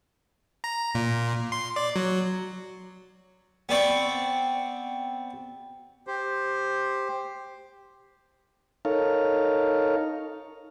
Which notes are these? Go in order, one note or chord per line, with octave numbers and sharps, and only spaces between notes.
A#5
A#2
C6
D5
F#3
B3 C4 D5 C#6
G4 C5
D#4 A4 A#4 C#5 F5